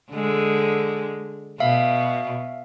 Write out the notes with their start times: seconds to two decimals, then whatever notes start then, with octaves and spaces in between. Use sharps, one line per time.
0.11 D3 G#3
1.60 B2 E5 F5